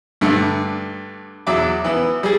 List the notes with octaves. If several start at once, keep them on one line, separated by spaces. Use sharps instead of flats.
G2 D3 A3
E2 F#3 E5 D6
E3 B3
G3 G#4